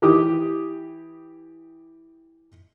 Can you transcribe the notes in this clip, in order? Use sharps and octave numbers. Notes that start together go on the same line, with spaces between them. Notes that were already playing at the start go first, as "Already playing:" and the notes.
E3 G4 D6 D#6